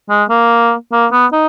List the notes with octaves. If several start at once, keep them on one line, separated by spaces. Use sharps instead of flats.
G#3
A#3
A#3
B3
D#4